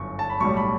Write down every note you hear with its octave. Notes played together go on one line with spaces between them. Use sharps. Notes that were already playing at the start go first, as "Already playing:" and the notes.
Already playing: G1 F#2 C#6
A5
B5
B1 A2 G3 C#6
B5